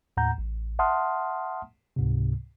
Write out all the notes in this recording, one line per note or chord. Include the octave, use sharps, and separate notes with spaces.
D#2 A2 F#5 A#5 G6
A1
E5 F#5 A5 C6 D#6 F6
C#2 G#2 C3